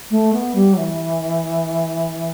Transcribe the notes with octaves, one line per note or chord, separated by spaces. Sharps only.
A3
B3
G3
F#3
E3